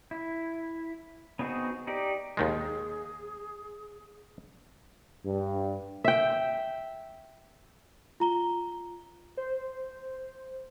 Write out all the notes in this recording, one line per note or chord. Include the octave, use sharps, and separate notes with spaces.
E4
B3 C4 D#4 F#4 G#4
D#4 G4 D5
D#2 D#3 G#3 G#4
G2
E5 G5
F4 A#5 G7
C5